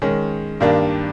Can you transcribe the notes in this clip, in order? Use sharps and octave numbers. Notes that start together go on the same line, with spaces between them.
D#3 G#3 C#4
G2 D#3 G3 A#3 D4